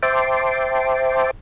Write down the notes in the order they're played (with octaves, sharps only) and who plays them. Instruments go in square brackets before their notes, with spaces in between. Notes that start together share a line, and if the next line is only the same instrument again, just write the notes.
[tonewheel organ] C5 E5 G5 A5 C6 D6